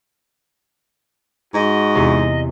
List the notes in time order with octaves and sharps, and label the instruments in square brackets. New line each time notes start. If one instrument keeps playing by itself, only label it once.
[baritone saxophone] G#2 [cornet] F#4 [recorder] D#5
[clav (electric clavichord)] E2 C3